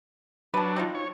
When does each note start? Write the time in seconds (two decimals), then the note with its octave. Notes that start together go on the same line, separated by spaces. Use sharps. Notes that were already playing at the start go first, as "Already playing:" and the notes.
0.54 F#3 D4 B4 A5
0.76 C4 D#4 F4
0.95 C#5